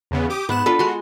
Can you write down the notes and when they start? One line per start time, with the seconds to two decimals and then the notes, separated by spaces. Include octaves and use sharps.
0.11 E2 C#3 B3
0.30 G4 D6 D#6
0.49 G#2 B3 F#6 E7
0.66 D4 F4 A4 B4
0.79 G#3 F#4 C6